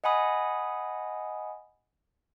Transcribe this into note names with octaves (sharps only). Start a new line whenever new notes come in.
D#5 F#5 G#5 B5 D#6